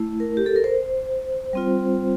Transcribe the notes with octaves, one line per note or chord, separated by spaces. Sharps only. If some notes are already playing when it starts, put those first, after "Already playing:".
Already playing: A3 E4
A#4
G4
A4
A#4
C5
G3 C4 F4